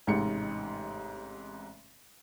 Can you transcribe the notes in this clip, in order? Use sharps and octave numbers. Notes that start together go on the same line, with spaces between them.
A1 G#2 C3 D#4 C#7